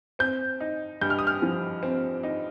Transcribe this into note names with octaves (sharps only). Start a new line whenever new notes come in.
C4 G6
D#4
G2 G6
F6
D#6
F6
F3
C4
D#4